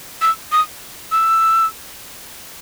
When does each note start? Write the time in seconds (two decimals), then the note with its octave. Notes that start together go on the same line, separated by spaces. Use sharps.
0.22 E6
0.52 D#6
1.12 E6